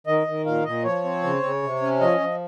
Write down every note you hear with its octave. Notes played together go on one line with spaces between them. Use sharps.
D#3 D#5
D#3
A#2 F5
A#2 D#5
F3 C#5
C4
C#3
C#3
C3
C#4
F3 D#5
F3